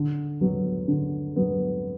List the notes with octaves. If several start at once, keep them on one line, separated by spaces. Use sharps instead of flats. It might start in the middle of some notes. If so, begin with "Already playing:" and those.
Already playing: D3
F#3 B3
D3
F#3 B3